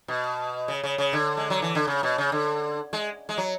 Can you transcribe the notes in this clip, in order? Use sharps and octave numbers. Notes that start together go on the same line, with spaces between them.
B2
C#3
C#3
C#3
D3
G#3
F#3
E3
D3
C#3
B2
C#3
D3
G#3
G#3
F#3